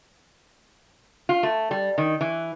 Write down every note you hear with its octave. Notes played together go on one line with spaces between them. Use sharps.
F4
A3
G3
D#3
E3